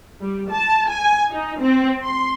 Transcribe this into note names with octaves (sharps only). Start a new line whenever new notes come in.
G3
A5
G#5
D#4
C4
C6